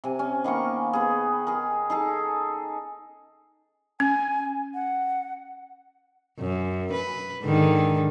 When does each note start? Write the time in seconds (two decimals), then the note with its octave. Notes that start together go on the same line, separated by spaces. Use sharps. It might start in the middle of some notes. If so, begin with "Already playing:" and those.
0.04 C3 G#5
0.19 C#4
0.44 D#3 A#3 B3 C#6
0.93 B3 G#4
1.47 G#4 A#4
1.90 D#4 G#4 A4
4.00 C#4 G#5
4.74 F#5
6.40 F#2
6.93 B4
7.42 G#2 D3 D#3